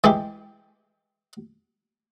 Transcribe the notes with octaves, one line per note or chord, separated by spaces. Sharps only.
E3 G#3 E4 G4